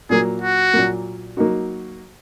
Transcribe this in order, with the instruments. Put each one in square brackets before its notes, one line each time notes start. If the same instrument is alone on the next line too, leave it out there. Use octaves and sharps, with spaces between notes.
[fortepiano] A#2 F#3 A#3 [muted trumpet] G#4
[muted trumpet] F#4
[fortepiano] A#2 F#3 A#3
F#3 A#3 D#4 F#4